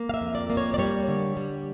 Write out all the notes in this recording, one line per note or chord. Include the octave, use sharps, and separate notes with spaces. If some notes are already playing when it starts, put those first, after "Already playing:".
Already playing: A#3
F5
E5
F2
D5
A#3
C#5
D5
G3 C#5
D3
G3